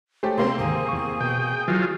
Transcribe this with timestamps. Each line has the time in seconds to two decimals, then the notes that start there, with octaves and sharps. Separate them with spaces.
0.23 A3 G4 G#4 C5 C#5
0.38 C3 A#3 C4 C6
0.58 D2 G#2 D#3 G#4
0.89 E2 C#6
1.21 B2 G5
1.68 E3 F#3 F4